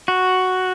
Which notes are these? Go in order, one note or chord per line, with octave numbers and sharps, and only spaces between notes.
F#4